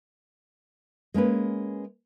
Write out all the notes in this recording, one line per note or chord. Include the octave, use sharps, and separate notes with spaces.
G#3 A#3 C#4 B4